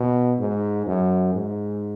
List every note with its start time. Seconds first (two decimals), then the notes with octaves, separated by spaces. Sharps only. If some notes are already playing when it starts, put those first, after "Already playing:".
Already playing: B2
0.39 G#2
0.87 F#2
1.34 G#2